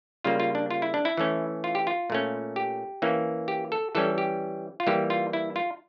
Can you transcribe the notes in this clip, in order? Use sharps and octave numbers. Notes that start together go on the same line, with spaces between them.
C#3 G3 A#3 F4
F4
D4
F4
E4
D4
E4
E3 A3 C#4
F4
G4
F4
A#2 A3 C#4
G4
E3 A#3 C#4
G4
A4
E3 G3 C#4 A4
G4
F4
E3 G3 A#3 G4
F4
E4
F4